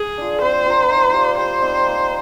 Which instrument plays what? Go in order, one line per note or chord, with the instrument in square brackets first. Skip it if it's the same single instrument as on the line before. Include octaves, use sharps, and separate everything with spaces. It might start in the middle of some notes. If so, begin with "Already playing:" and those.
Already playing: [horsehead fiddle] G#4
[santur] D4 F4
[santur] C4 [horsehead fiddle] C5
[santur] F4 A#4
D#4
G4 D5 F5
[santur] G3 [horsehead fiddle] C5
[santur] C4 D#4
A#3